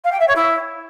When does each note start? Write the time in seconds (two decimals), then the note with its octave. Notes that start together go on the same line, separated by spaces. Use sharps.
0.04 F5
0.12 G5
0.20 E5
0.28 C#5
0.36 E4